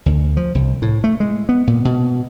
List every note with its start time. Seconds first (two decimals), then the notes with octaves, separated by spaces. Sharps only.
0.06 D2
0.37 F3
0.55 C2
0.82 A2
1.04 A3
1.20 G#3
1.49 B3
1.67 A#2
1.85 B2